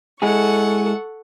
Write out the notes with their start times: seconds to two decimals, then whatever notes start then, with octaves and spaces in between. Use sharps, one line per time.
0.22 G#3 E4 G#4 A4 F#5 C#6